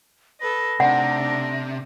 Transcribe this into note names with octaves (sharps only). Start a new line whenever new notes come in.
A4 B4 D#5 A#6
C3 A3 D4 D#4 F#5